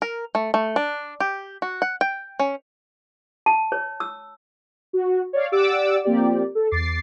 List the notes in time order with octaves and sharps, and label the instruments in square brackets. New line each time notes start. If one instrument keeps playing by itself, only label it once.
[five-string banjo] A#4
A3
A3
D4
G4
F#4
F#5
G5
C#4
[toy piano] A5
C#5
E6
[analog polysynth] F#4
C#5 D5 F5
G4 D5 F#5 D6 E6
F3 A#3 C4 G4 D5
A4
E2 D6 A6 C7